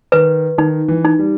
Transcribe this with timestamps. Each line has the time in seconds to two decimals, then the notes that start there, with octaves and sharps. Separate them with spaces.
0.12 D#3 B4
0.58 D#3 D#4
0.88 E3
1.05 D#4
1.19 G3